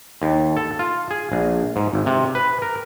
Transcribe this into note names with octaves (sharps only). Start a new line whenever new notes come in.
D#2
A4
F4
G#4
A#1
G#2
G#1
C3
B4
A#4